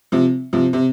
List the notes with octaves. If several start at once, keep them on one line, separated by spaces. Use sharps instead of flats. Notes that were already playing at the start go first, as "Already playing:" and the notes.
C3 F3
C3 F3
C3